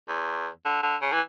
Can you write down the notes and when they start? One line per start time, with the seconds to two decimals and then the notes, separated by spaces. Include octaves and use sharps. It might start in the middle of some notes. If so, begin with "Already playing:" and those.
0.08 E2
0.65 D3
0.83 D3
1.02 C#3
1.12 E3